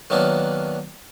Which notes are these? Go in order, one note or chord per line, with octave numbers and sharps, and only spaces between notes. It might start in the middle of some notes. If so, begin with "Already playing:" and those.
D#3 F#3 A#3 B3 D4